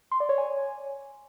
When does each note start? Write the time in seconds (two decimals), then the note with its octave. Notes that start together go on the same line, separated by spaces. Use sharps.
0.11 C6
0.20 D5
0.29 C#5
0.38 G#5